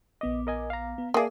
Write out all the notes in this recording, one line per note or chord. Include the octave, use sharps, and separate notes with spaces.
A#1 B3 D#5 D6
A#4 D#5 G#5
F5 A#5
B3
A#3 G#4 B4 D5 E5 F5 A5 D#6